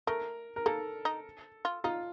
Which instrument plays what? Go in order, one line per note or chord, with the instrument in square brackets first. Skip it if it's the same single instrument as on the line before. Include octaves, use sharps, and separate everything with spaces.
[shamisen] A3 [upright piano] A#4
[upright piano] A#4
[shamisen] A#3 [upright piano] A4
[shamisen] D#4
F4
[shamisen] D#4 [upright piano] F4